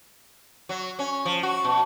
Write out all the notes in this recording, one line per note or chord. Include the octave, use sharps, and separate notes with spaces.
F#3
C#4
F3
F#4
B2